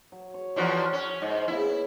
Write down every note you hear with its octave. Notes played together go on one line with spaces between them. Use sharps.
F#3
C#5
E2 F3 F#4
C#4
G#2 E4
C#3 B3 C#4 E4